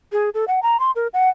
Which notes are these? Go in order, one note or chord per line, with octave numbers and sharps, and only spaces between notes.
G#4
A4
F#5
A#5
C6
A#4
F#5